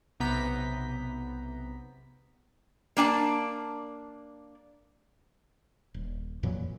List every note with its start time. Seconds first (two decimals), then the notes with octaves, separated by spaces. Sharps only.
0.20 B1 C3 B3 A#5 G6 B6
2.97 A#3 D4 G#5 A5
5.94 D#1
6.43 F2 A#2 E3 F#3